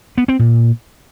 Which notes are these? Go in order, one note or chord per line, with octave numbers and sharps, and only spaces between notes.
B3
C4
A#2